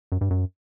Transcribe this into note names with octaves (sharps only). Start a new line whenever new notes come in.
F#2
G2
F#2